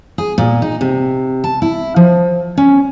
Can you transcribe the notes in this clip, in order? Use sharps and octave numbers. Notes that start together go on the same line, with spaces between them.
G#4
A#2
D#4
C3
A5
E4
F3
C#4